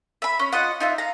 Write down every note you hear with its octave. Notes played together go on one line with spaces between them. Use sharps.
E5 B5
C#4
F4 D#5 F#5
D#4 F4 E5
F5 A#5